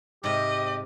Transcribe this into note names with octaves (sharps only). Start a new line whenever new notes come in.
G#2 C3 G4 D#5